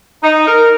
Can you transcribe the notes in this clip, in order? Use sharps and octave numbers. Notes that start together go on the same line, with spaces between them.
D#4
A#4